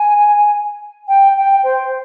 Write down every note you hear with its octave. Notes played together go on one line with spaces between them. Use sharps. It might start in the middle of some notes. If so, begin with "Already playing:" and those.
Already playing: G#5
G5
G5
C5